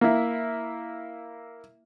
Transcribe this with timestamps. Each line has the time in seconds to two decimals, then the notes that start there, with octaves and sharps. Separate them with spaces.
0.01 A#3 E4